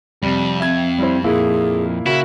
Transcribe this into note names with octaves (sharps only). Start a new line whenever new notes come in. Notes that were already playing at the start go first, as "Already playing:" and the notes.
F2 C3 G3
C4 E5 G#6
G3 E4 C5
A#2 A#3 E4 G#4
C#3 A#3 E4 F#4 E5